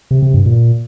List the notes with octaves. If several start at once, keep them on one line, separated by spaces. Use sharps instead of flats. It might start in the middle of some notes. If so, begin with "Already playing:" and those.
C3
C3
G2
A#2